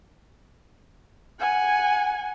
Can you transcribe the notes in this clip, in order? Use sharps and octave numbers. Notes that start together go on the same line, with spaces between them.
F#5 G#5